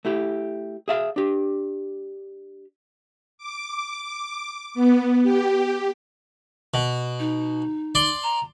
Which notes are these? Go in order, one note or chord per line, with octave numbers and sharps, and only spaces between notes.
A3 E4 G4
G#4 E5 F5
D4 G4
D6
B3
G4
B2
D#4
D5 C6
A#5